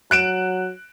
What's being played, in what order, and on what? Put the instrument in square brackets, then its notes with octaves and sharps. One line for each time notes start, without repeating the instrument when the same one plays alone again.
[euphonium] F#3 [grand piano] F#6 D7 E7